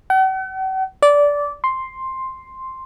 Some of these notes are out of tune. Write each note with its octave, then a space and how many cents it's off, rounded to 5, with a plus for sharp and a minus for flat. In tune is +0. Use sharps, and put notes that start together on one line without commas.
F#5 +45
D5 -15
C6 +5